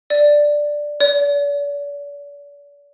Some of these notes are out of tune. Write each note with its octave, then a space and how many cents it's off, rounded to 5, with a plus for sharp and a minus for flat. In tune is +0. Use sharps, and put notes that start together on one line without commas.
D5 +5
D5 -40